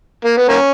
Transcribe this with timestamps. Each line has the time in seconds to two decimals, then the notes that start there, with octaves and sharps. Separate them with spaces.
0.25 A#3
0.37 B3
0.49 A#3 C#4